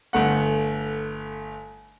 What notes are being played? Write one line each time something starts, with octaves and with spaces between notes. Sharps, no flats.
G1 A3 F#5